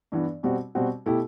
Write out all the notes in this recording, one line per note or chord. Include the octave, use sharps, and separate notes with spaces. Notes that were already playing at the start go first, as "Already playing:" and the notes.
G2 E3 B3
B2 G3 C4 F#4
B2 G3 C4 F#4
B2 A3 E4 G4